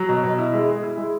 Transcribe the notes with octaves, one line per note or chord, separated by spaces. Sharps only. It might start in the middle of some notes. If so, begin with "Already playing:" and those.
Already playing: F#3
B2
B2
E4
G#3
G#4
E4
G#3